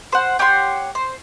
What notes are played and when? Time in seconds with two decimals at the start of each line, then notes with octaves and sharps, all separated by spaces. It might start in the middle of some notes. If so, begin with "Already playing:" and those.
0.12 C5 F#5
0.39 G4 C#5 F#5 C6
0.95 C5